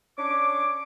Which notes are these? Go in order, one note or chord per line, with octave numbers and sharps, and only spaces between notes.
C#4 D4 C#5 D6